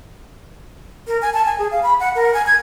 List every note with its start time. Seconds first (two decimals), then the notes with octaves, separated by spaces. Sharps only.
1.07 A#4
1.22 G#5
1.34 A5
1.46 G#5
1.58 G#4
1.71 F5
1.83 B5
2.00 F#5
2.15 A#4
2.34 G#5
2.47 G#6